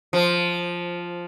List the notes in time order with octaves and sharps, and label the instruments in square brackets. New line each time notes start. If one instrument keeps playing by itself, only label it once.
[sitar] F3